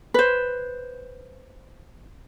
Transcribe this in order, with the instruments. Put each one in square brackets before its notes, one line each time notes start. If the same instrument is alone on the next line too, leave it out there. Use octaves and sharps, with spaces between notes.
[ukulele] B4 C5